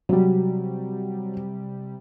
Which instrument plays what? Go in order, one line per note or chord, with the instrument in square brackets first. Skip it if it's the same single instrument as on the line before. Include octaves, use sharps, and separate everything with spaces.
[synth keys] C3 G3 [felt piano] F#3